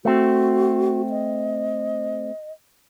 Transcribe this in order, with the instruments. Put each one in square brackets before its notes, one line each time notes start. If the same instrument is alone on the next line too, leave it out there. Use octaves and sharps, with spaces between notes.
[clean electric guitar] A3 C4 [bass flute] F#4
[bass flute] D#5